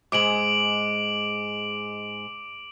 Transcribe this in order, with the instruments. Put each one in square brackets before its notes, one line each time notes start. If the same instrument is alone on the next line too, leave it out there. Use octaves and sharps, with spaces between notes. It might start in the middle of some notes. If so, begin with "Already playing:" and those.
[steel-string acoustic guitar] G#2 G#3 [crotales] D6 D7 F#7